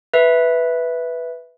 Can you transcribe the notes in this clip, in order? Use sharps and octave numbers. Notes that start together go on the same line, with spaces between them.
B4 E5